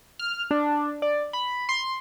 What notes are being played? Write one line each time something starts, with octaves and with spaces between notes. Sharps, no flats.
F6
D4
D5
B5
C6